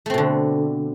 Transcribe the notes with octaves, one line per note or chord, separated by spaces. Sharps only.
B2 D3 A3 C4